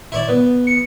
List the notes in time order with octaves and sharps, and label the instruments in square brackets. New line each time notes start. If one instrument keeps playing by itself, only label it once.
[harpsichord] E4 C#5 D5
B3
[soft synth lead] C#7